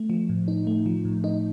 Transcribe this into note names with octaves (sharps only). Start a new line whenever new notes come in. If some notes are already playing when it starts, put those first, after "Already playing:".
Already playing: A3
F3
A2
D#4
A3
F3
A2
D#4